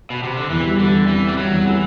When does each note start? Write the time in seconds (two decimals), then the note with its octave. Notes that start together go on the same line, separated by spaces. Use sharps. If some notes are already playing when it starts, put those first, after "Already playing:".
0.10 B2
0.23 C3
0.37 D3
0.50 E2 E3
0.64 G3
0.79 D3 G3
0.94 E2
1.07 E3 C4
1.23 G3 C4
1.37 F#3 G3
1.51 E2
1.66 E3 A3